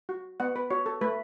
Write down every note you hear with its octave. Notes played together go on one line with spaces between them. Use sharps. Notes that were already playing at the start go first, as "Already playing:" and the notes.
F#4
B3 F#5
B4
F#4 C#5
A4
A3 B4